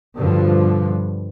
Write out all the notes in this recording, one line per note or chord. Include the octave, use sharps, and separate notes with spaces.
G2 B2 D3 F3